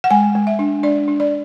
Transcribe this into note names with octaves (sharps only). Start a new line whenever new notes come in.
F#5
G#3 G#5
G#3
E5
D4
D4 D5
D4
D5